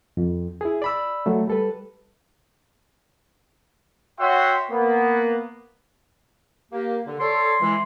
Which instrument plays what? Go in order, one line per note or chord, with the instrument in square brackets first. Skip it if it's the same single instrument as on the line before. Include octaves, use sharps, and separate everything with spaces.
[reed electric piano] F2
E4 G#4
D5 B5 E6
F#3 A3
G3 A4 B4
[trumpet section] F#4 C#5 E5 F#5 G5 C6
A#3 B3
[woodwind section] A#3 G4
D3
[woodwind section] A4 C#5 D5 [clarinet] C6
[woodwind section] E3 G#3